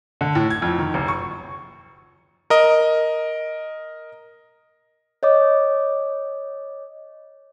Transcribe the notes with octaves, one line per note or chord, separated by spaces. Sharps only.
D3
A2
G#6
F2
D#3
F#1
C#6
A#4 D#5
C#5 D#5 D6